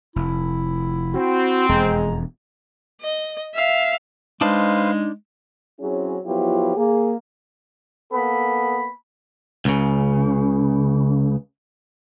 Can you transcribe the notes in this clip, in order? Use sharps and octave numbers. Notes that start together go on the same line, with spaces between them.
F1 E4
C4 F#4
E1 F2 G#3 A#5
D#5
E5 F5
G#3 D4 D#4 B4 C5 F5 A5
F#3 C4 C#4 E4 G#4
F3 F#3 B3 E4 F4 G4
A#3 G#4
A#3 B3 A4 B5
C#2 C#3